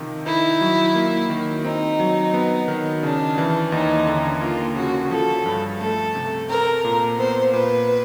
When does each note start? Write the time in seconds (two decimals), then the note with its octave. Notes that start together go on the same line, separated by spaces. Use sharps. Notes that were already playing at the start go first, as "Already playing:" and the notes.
Already playing: C3 D#3 F3
0.26 D#4 E4
0.61 F#3
0.95 A#3
1.30 D#3
1.64 C4 D#4
2.00 F#3
2.34 B3
2.68 D#3
3.03 C#3 D4
3.38 E3
3.72 D#2 D#4
4.07 D3
4.41 A#3 F4
4.76 C#3 F#4
5.11 F3 A4
5.46 G2
5.80 A3 A4
6.15 C3
6.49 C4 A#4
6.85 A#2
7.19 B3 C5
7.53 A#2 B4